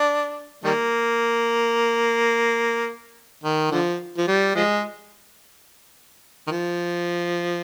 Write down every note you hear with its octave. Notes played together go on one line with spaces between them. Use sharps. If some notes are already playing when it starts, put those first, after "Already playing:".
Already playing: D4
D#3 G3 A#3
D#3
D3 F3
F3
G3
F3 G#3
D#3
F3